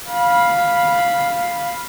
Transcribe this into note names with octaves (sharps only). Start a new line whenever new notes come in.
F5 B5